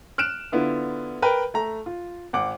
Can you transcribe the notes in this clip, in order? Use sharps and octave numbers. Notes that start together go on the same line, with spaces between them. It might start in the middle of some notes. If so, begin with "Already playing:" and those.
F6 F#6 D7 E7
D3 B3 E4 F4
A#4 B4 G5 B5
A3 A#5
F4
G#1 F#5 D6